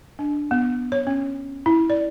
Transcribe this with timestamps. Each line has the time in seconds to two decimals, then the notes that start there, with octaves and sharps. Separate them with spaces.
0.19 D4
0.51 B3
0.92 C#5
1.07 C#4
1.66 E4
1.90 D5